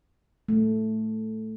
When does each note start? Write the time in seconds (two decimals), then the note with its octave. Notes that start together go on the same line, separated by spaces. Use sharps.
0.49 A3